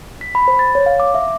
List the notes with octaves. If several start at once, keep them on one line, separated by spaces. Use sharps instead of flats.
B6
B5
C5
A6
C#5
F5
D6
E5